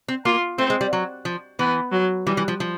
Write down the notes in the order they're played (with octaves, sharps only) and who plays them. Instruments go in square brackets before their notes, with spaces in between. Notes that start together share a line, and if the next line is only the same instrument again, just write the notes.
[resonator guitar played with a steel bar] C4
[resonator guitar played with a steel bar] A#3 [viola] F4
[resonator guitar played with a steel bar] A3 [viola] C4
[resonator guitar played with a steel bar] G#3
G3
F#3
F3
[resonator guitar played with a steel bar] E3 [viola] B3
[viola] F#3
[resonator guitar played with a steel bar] E3 [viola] G3
[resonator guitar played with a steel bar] E3
F3
F3